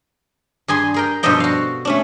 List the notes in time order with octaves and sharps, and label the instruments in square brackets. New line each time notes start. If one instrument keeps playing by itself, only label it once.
[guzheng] G2 G#4 G#5 C6
G#4 A#4 G5
G2 B2 F3 A4 D#5 G5
F#4 F5
A3 C#4 D4